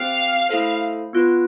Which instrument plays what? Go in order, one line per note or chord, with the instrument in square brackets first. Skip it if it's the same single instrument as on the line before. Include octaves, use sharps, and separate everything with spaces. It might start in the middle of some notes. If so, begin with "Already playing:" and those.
Already playing: [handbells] C4 G4 C5 G5 [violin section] F5
[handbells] A3 E4 A4 C5
B3 F4 B4